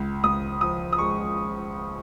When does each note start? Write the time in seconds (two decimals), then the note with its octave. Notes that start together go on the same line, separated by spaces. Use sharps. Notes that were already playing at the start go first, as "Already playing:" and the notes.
Already playing: C#2
0.24 C#2 D#6
0.61 F3 D#6
0.93 D#6
0.98 G#3 C#6